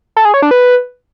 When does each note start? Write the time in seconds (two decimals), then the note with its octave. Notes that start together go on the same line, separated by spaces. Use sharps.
0.17 A4
0.25 G#4
0.34 C#5
0.42 D4
0.51 B4